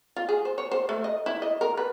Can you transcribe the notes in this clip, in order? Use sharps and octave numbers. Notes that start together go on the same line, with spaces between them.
F4
G#4
C5
C#5
C5
A3
D#5
E4
D#5
A#4
B4